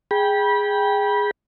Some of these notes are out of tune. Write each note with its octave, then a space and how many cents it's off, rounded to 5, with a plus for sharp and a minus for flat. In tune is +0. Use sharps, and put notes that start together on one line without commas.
G#4 -5 G5 +5 B5 -25